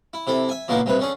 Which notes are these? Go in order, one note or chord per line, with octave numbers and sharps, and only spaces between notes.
E4
C3 E4 A4
E5 G#5
A#2 C#3 A#3 B3 D#4 E4
G2 C3 B4
D3 C#4 G#4